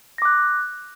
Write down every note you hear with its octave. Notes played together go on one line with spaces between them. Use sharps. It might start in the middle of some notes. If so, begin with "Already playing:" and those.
D6 F#6 A#6